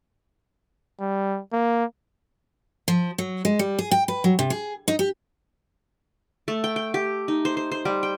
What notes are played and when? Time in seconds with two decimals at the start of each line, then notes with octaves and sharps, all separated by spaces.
1.00 G3
1.53 A#3
2.88 F3
3.18 F#3
3.45 G#3
3.59 G3
3.79 G#4
3.91 G5
4.08 B4
4.24 F#3
4.39 C3
4.50 G#4
4.88 D#4
4.99 G4
6.48 A3
6.64 G5
6.76 G5
6.94 G4
7.28 D#4
7.45 C5
7.57 C5
7.72 C5
7.85 G3
8.03 G5